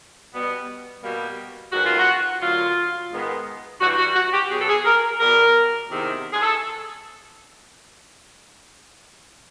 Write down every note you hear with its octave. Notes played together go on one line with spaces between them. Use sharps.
B2 G3 B3
B2 G3 A#3
F#2 D#3 G#3 B3 F#4
F4
F#4
D2 D3 F#3 A#3 F4
G#2 D#3 G#3 B3
G2 E3 G3 F#4
F#4
F#4
G4
B2 F#3 B3 G#4
A4
G#4
A#4
E2 B2 G3 B3 A#4
E2 C3 D#3
G#4
A4